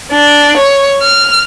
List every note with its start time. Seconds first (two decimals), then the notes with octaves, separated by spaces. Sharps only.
0.12 D4
0.58 C#5
1.00 F6